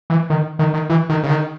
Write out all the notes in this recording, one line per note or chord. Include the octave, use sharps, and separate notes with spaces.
E3
D#3
D#3
D#3
E3
D#3
C#3
D#3